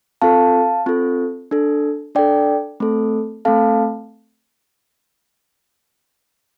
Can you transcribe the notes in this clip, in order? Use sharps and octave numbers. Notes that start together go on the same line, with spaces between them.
C4 F4 A4 F5 A5
C4 F4 A4
D4 A4
D4 A4 D5 G5
A3 C4 A4
A3 C4 A4 F5 A5